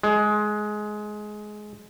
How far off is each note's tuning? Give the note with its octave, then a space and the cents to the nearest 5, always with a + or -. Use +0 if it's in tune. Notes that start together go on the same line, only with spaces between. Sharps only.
G#3 +15